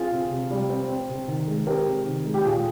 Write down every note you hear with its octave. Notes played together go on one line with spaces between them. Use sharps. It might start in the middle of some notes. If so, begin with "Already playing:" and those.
Already playing: C4 F4 G#4
C3
C3
G3
C4
C4
C3
D#3
G#3
C4 G4 A#4
C3
D#3
G#3
G4
A#2 F4 G#4